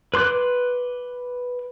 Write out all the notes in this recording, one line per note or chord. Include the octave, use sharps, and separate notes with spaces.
B4 C6 D6 F#6